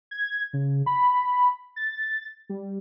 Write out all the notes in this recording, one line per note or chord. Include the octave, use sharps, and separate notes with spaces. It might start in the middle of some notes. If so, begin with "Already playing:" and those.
G#6
C#3
B5
A6
G3